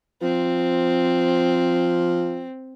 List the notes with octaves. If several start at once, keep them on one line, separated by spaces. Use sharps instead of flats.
F3 C4